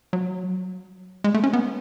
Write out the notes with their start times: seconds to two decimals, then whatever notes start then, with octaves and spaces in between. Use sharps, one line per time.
0.13 F#3
1.24 G#3
1.34 A3
1.44 C#4
1.53 B3